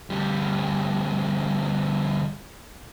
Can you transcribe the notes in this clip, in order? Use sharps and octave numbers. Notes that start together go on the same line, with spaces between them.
D2 G3